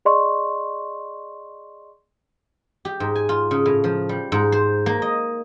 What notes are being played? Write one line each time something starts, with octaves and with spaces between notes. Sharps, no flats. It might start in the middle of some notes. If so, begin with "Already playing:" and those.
G#4 D5 D#5 C6 C#6
G4
G#2
G#5
F4
C#3
A2
F3
G3
G#2
C5
A#3
D#5